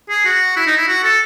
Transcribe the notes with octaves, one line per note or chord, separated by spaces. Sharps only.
G#4
F#4
E4
D#4
E4
F#4
A4